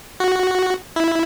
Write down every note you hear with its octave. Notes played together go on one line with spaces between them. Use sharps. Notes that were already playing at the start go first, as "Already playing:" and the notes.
F#4
E4